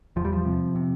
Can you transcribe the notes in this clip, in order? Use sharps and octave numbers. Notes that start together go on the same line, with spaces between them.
E2 F3
G3
F3
C3
C3